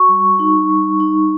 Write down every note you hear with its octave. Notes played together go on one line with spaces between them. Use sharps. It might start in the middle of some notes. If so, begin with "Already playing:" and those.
Already playing: F#4 C#6
G3
D#4
G3
D#4